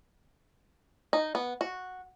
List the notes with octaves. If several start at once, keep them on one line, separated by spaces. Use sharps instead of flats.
D#4
B3
F#4